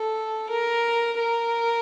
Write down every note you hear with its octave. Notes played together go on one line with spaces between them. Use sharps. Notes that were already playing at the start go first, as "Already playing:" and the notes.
Already playing: A4
A#4
A#4